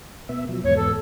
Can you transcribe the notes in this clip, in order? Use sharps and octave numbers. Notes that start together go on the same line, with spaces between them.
B2 B3 E5
B2 F3 F#3
E2 G#2 B3 C#5
A4